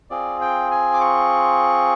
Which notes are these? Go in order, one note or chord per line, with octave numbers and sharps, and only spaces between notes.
C4 F4 G#4 D5
G5
G#5
D6
C#6